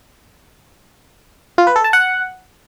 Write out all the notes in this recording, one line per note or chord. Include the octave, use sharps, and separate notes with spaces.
F4
B4
A4
A5
F#5